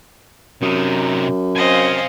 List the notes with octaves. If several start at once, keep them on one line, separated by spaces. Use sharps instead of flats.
F#2 C3 D#4
C4 D#5 F5 G#5